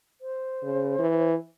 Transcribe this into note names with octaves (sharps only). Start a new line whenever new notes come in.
C5
C#3
E3